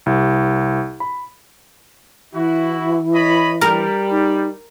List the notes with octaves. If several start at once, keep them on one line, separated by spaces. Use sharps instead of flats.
C2
B5
E3 E4 F#4
C#5 D#5 B5
G3 A#4
D#4